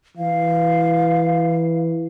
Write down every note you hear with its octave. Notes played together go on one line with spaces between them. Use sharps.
E3 F5